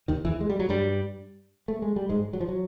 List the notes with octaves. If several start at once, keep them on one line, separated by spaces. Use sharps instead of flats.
D#2 D#3
E2 E3
G#3
G3
F#3
G2 G3
A3
G#3
G3
G#2 G#3
F#3
F3
F#3